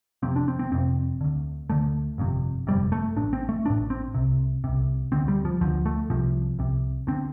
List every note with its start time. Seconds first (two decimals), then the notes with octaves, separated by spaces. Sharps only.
0.23 F1 F2 C3 C4
0.36 D4
0.48 C4
0.59 C4
0.71 F1 F2 C3 C4
1.21 D2 D3
1.70 D2 D3 A3
2.18 G1 F2 C3
2.67 G1 F2 C3 G3
2.92 A3
3.16 A1 A2 D4
3.33 C4
3.49 A3
3.66 A1 A2 D4
3.90 C4
4.14 C2 C3
4.64 C2 C3
5.12 D2 D3 C4
5.28 G3
5.45 F3
5.61 D2 D3 F3
5.86 A3
6.10 C2 C3 F3
6.59 C2 C3
7.07 D3 C4